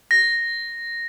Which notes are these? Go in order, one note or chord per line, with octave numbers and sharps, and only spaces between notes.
A#6